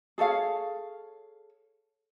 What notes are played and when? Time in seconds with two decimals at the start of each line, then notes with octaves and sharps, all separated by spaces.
0.18 G#4 A4 C#5 F5